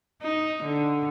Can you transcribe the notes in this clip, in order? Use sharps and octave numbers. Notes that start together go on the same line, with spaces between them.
D#4
D3